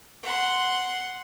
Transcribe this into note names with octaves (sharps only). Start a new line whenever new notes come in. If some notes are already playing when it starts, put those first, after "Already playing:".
F#5 C6